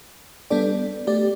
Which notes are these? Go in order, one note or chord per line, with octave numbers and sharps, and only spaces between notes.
G3 B3 D4 A4 D5
A3 G4 D5